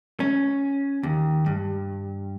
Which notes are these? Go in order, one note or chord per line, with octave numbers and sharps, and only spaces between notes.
C#4
D#2
G2